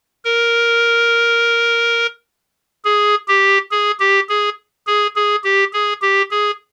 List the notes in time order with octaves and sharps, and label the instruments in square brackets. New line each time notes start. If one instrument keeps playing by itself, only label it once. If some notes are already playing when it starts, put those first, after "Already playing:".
[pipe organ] A#4
G#4
G4
G#4
G4
G#4
G#4
G#4
G4
G#4
G4
G#4